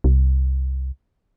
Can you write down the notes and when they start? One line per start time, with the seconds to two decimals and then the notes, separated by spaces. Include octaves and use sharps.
0.04 C2